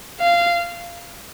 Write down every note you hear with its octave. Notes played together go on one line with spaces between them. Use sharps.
F5